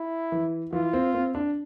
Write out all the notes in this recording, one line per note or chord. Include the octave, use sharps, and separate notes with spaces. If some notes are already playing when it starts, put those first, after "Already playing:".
Already playing: E4
E3
E3 F4
C4
C4
D4